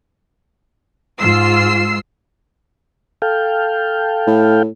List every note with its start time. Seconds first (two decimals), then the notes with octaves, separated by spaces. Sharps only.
1.19 G#2 F4 E6 C7
3.22 A4 F5 G5
4.27 A2